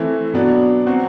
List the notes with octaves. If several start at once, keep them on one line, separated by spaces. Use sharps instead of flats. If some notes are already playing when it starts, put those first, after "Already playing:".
Already playing: E3 A3 C4 E4
B2 F#3 B3 D4
F#3 C4 F#4